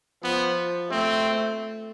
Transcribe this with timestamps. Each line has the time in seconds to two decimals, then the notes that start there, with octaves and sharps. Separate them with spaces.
0.24 F3 B3
0.91 A3 C4